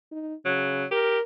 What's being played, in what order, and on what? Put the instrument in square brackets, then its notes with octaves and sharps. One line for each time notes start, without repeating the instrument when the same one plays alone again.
[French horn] D#4
[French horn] C#3 [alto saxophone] F#3
[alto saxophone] G4 [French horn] A#4